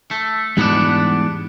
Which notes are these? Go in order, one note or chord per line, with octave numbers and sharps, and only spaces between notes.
A3
E2 G#2 B2 G3 B3 D4